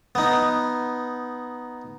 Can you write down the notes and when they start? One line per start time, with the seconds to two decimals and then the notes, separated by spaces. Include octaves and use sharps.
0.15 B3 D#4